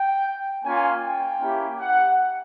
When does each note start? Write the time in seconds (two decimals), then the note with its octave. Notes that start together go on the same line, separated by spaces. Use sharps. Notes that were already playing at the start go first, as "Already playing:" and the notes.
Already playing: G5
0.64 A#3 C#4 F4 G#5
1.03 G5
1.41 A#3 C#4 E4 G4
1.80 F#5